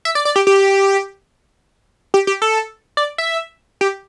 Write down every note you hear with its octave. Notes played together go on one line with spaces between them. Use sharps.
E5
D5
D5
G4
G4
G4
G4
A4
D5
E5
G4